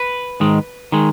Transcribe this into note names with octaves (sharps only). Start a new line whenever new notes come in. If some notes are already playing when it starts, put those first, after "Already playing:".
Already playing: B4
G#2 D#3 G#3
D#3 G#3